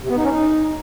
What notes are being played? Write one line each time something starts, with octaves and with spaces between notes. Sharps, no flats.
C3
B3
D#4
C#4
D#4